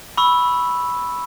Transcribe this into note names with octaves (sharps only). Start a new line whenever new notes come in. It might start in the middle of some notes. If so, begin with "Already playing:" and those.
B5 C#6 E6